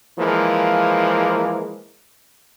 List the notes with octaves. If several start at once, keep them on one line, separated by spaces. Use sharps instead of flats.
E3 F3 G#3 A#3